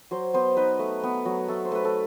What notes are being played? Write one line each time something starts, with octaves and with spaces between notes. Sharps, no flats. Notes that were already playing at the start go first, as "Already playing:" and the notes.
F#3 C5
B3 C5
D#4 B4
A3
B3
F#3
A3 A4
C5
A3 B4
A4